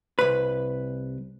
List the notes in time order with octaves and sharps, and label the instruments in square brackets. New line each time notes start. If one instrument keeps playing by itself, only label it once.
[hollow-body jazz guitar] C2 B4